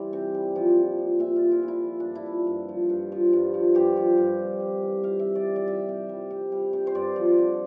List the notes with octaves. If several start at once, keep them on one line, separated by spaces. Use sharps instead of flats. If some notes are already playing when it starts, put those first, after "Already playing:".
Already playing: E3 G3 C5 D5
C3
G3
F3
A#2
F3
A#2 E5
F4
F3
E4
A#2
E4
F3
G2 D4
E4
F3
G2
F3
G2
F3
G2
F3
G2 G4
F3
G2
C3
G3
E3
C3 F5
C3 E5
D5
G3
D5
G3 E5
C3
G3
C3
G3
C3
C5
G2 D5
F3
D3